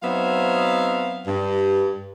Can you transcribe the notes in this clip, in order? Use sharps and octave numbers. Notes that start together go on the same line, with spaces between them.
F#3 B3 C4 D#4 E5 F5
G2